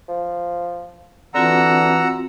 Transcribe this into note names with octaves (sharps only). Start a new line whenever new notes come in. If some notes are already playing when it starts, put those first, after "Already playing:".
F3
D3 E3 C4 F4 F#4 F#5 A#5 E6